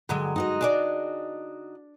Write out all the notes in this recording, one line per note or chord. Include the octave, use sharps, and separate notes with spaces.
G2 D3 F#3 G#3
D#4 F#4 D#5
D4 G#4 D5